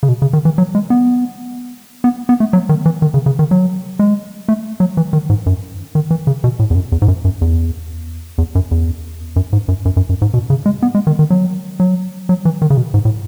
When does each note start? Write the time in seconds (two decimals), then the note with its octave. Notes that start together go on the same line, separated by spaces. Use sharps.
0.03 C#3
0.09 B2
0.22 C#3
0.33 D#3
0.45 E3
0.58 F#3
0.75 G#3
0.90 B3
2.04 B3
2.29 B3
2.40 A3
2.53 F#3
2.69 D#3
2.86 E3
3.02 D#3
3.14 C#3
3.26 C#3
3.39 D#3
3.51 F#3
3.99 G#3
4.48 A3
4.80 F#3
4.97 E3
5.13 D#3
5.29 G#2
5.46 F#2
5.95 D#3
6.10 E3
6.27 C#3
6.44 B2
6.59 A2
6.70 E2
6.75 F#2
6.92 E2
7.02 G#2
7.08 F#2
7.24 F#2
7.41 E2
8.38 E2
8.55 F#2
8.71 E2
9.36 F#2
9.53 G#2
9.68 F#2
9.85 F#2
9.97 F#2
10.09 F#2
10.22 G#2
10.34 B2
10.50 C#3
10.66 G#3
10.82 B3
10.95 G#3
11.07 D#3
11.19 D#3
11.30 F#3
11.80 F#3
12.29 F#3
12.45 E3
12.62 D#3
12.70 C#3
12.77 B2
12.94 G#2
13.05 A2